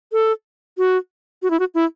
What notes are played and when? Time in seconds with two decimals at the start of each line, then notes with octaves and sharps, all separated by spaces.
0.12 A4
0.78 F#4
1.42 F#4
1.50 E4
1.59 F#4
1.75 E4